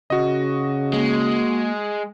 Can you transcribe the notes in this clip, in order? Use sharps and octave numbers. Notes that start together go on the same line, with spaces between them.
C#3 F#4 D#5
G#3 A#3